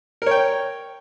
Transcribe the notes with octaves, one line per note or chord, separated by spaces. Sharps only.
A#4 C#5 G5